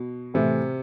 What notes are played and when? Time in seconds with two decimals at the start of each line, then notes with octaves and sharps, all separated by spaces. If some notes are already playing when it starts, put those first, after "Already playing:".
Already playing: B2
0.34 A2 C3 E3 A3 E4